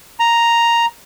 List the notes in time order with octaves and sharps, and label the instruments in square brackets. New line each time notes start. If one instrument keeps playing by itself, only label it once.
[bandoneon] A#5